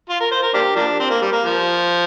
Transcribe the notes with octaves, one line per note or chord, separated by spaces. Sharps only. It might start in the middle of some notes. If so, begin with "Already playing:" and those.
F4
A#4
C5
A#4
A#3 D4 G4
F3 A#3 D4
C4
A#3
G3
A#3
F3